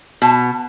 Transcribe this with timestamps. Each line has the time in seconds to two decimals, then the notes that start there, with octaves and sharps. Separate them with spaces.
0.22 B2